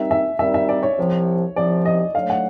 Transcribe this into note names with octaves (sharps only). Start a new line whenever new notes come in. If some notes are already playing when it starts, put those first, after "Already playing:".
Already playing: D#2 D#3 G3 C4 D#4 E5
E5
D#2 D#3 G3 C4 D#4 E5
E5
D5
C#5
C2 C3 F3
C2 C3 F3 D5
D#5
D3 F#3 A3 F5
F#5